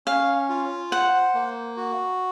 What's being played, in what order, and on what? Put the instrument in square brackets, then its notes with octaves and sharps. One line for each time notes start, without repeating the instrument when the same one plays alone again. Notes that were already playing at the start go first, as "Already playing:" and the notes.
[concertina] C#4 [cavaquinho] F5
[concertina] F4
[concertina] C5 [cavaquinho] F#5
[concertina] A#3
F#4